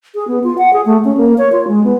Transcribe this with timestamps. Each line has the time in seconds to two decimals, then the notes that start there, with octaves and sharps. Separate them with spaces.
0.15 G#4
0.28 B3
0.44 F4
0.58 F#5
0.73 G#4
0.86 A3
1.05 C#4
1.17 A#3
1.38 C#5
1.52 F4
1.68 G#3
1.84 B3